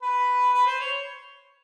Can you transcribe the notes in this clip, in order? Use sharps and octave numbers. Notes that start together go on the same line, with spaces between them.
B4
B4
C5
C#5